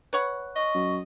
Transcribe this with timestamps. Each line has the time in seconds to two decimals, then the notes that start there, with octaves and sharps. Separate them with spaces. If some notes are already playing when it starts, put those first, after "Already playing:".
0.13 B4 C#5 F#5
0.56 D#5 C#6
0.75 F#2